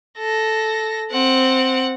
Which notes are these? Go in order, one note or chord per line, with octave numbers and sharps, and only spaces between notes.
A4 A#6
C4 F#5